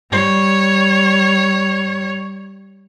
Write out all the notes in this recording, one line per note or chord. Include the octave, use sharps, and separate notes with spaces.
G3 C#5